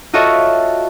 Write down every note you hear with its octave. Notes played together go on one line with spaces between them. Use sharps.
F4 F#4 A4 C#5 D#5 E5